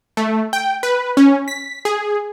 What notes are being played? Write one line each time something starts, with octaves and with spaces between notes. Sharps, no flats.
A3
G5
B4
C#4
B6
G#4